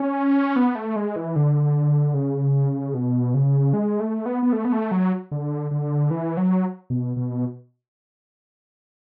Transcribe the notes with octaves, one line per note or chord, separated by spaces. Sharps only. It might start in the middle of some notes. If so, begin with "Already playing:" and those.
Already playing: C#4
B3
A3
G#3
E3
D3
C#3
B2
C#3
G#3
A3
B3
B3
A3
B3
A3
F#3
D3
D3
E3
F#3
B2
B2